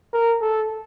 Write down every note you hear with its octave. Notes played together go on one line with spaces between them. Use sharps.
A#4
A4